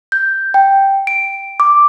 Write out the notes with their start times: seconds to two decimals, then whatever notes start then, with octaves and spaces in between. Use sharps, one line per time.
0.12 G6
0.54 G5
1.07 D7
1.60 D6